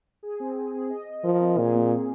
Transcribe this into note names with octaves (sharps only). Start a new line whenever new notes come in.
G#4
C4
C4
G#4
D#5
D#5
F3 A#4
C4
A#2 G#4
A#3
A#3